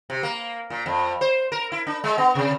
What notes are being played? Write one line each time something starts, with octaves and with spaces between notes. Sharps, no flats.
C3
A#3
A#2
F2
C5
A#4
E4
D4
G#3
B3
C3